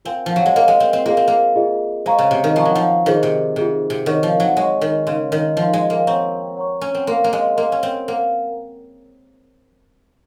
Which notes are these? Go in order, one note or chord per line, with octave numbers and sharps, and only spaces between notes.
C4 F4 A#4 F5 G#5
F3
F#3
G#3
A#3 F4 A#4 F5 G#5
G#3
C4
C4
A#3 F4 G#4 D#5
C4
A#3
F4 G#4 D#5
G#3 C5 F5 A#5 C#6
C#3
C3
D#3
F3 C5 F5 A#5 C#6
F#3
F3
D#3 F4 G#4 C5
C3
C3 F4 G#4 C5
C3
D#3 C#5 F#5 C#6
F3
F#3
G#3 C#5 F#5 C#6
D#3
C#3 D#4 A#4 F5 C6
D#3
F3 D#4 A#4 F5 C6
G#3
A#3
C4 C#5 F#5 A#5 C#6
C#5 F#5 A#5 C#6
C#4
C4
A#3 A#4 F5 C6
A#3
G#3
A#3 A#4 F5 C6
C#4
C4
A#3 C5 F#5